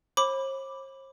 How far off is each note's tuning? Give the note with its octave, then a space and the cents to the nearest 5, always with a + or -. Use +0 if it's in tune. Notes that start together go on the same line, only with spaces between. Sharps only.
C5 +45 B5 +0 D6 +0